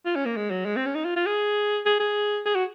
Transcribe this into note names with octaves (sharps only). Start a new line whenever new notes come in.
F4
C#4
A#3
G#3
F#3
G#3
C4
C#4
D#4
F4
F4
G#4
G#4
G#4
G#4
F#4